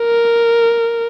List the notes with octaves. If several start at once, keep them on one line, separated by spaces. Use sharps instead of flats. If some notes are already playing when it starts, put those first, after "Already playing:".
Already playing: A#4